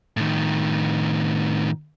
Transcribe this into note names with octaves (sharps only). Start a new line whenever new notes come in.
A2 D#3